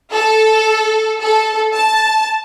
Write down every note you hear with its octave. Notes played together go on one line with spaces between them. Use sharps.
A4
A4
A5